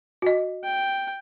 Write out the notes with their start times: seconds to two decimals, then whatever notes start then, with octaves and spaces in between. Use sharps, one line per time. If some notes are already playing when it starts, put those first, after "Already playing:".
0.22 F#4 D#5
0.64 G5